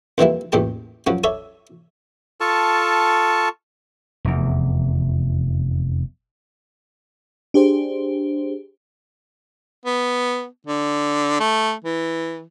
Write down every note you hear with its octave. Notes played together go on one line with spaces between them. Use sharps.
F2 D#3 E3 G3 A#3 E4
A1 E2 A#2 G4 A5
F#2 F3 F#3 C#4
A4 C#5 D5 E5
F4 A4 A5 C#6
F1 E2
D4 G4 G#4 C5
B3
D3
A3
E3